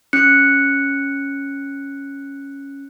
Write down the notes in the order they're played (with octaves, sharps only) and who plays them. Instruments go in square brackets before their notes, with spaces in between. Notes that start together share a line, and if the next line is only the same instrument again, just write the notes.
[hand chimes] C#4 F#6 C#7